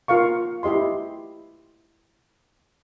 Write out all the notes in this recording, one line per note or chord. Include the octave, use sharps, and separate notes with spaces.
F4 A#4 F5 C#6
E4 G4 D#5 C6